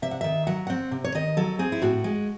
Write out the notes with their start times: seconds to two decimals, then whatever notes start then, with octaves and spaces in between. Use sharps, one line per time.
0.02 C3 E5
0.11 F#5
0.21 D#3 E5
0.47 F#3 F#5
0.67 C4 F#5
0.91 C3
1.04 C#5
1.15 D#3 D#5
1.37 F#3 A4
1.59 C4 G#4
1.72 E4
1.82 A2 F#4
2.04 G#3